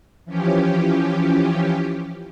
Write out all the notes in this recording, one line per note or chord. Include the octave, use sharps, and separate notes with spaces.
E3 F3 C#4 G4